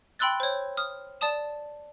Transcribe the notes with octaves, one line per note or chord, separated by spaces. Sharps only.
G5 B5 C6 E6 F#6 A6
C5 C#5
D#6 F6
D5 A5 D#6 E7